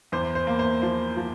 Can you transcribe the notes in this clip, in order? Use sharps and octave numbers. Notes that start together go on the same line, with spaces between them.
E2 C5
C5
A#3
C5
F3 C5
F3